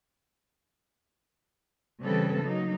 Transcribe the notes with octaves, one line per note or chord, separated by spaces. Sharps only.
C#3 E3 G3 C4 A4 B4
F#3 A#3 D#4